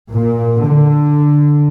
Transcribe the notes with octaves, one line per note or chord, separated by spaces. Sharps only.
A#2
D3